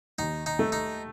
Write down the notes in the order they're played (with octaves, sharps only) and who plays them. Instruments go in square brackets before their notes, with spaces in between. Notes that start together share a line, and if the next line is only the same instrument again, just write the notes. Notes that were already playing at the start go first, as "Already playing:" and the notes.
[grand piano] D#2 [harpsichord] D#4
[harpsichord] D#4
[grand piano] A3
[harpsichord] D#4